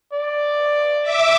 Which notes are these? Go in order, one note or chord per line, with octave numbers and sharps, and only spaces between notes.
D5
E5 D6